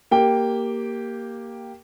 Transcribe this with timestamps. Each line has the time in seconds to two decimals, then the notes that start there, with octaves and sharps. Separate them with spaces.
0.11 A#3 G4 G5